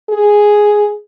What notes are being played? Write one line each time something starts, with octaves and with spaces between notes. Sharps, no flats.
G#4